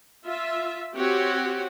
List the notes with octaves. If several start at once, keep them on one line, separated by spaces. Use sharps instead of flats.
F4 E5
C4 F#4 G4 C#5 F#5